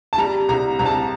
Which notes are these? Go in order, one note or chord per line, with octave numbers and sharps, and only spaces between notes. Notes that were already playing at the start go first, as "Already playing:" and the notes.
A5
G3 A#5
C2 A#5
C2 A#5
A5
A#5